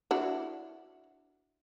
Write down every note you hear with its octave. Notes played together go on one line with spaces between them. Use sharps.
D4 E4 F#4